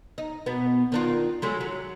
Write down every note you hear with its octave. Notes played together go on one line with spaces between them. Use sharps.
D#4
B2 B3
D#3 D4 F4
F#3 G#3 A3
F#3